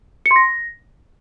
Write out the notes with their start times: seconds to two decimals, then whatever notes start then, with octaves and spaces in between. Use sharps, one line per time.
0.26 C#7
0.31 C6
0.36 A#6